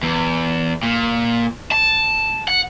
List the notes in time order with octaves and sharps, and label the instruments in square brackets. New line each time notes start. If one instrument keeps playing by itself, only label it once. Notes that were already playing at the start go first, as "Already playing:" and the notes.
[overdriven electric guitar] E2
A#2
A5
F#5